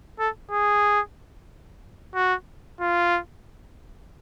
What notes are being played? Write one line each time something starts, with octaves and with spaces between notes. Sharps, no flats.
A4
G#4
F#4
F4